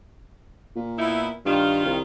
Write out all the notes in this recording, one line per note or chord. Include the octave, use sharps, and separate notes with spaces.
A#2
B3 D#4 E4
G2 D#3 F4
C2